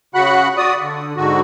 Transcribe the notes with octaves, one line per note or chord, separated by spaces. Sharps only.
C#3 F#4 F#5 B5 F#6
F#4 D5 D#6
D3
G#2 D3 F#4